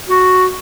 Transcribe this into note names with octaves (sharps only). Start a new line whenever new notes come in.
F#4